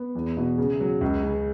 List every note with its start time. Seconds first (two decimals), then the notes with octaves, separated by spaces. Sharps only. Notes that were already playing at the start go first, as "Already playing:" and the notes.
Already playing: B3
0.15 E2
0.37 B2
0.58 C#3
0.80 F#3
1.01 C#2
1.23 C#3